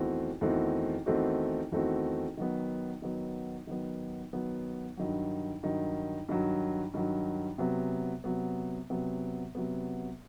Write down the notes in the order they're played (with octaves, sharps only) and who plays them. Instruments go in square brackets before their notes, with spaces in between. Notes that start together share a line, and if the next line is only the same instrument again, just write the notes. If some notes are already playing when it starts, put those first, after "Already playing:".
Already playing: [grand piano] E2 D#3 A3 C4 F#4
E2 D#3 A3 C4 F#4
E2 D#3 A3 C4 F#4
E2 D#3 A3 C4 F#4
D#3 F#3 B3
D#3 F#3 B3
D#3 F#3 B3
D#3 F#3 B3
G2 D#3 F#3
G2 D#3 F#3
G2 D#3 F#3
G2 D#3 F#3
C3 F#3 B3
C3 F#3 B3
C3 F#3 B3
C3 F#3 B3